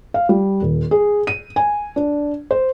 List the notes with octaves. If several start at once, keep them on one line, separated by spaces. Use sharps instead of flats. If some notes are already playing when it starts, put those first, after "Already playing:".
F5
G3
D#1
G#4
D#7
G#5
D4
C5